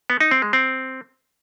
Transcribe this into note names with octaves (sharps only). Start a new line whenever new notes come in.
B3
D#4
C4
G#3
C4